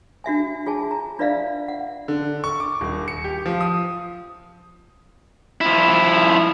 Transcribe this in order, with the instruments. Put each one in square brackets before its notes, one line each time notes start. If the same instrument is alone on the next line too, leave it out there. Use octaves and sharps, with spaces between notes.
[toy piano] D4 F#4 E5 G#5
F4 G#4 G#5 A5
A#5
D4 F4 B4 D5 E5 F5
F#5
[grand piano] D3
C#6
D6
D#1
C#7
G4
F3
D#6
[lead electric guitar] F3 E4